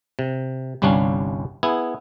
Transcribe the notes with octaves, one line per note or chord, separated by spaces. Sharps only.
C3
G1 C2 G3 C#4 D4 F5
B3 E4 G#4